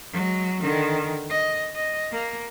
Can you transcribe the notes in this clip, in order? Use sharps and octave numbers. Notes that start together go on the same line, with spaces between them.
F#3 G#3
D3 D#3
D#5
D#5
A#3